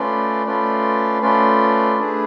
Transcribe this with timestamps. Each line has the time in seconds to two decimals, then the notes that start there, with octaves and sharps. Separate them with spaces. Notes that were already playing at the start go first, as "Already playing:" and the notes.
Already playing: A3 C#4 F4 B4 D5
0.46 A3 C#4 F4 B4 D5
1.22 A3 C#4 F4 B4 D5
1.98 A3 D4 G#4 B4